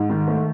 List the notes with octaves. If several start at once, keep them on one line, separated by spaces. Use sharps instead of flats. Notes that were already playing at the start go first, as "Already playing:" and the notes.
Already playing: G#2
D#3
A3